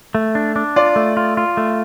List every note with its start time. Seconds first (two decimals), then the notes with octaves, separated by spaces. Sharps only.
0.15 A3
0.35 D4
0.56 D4
0.76 F4 D5
0.96 A3
1.17 F4
1.37 F4
1.57 A3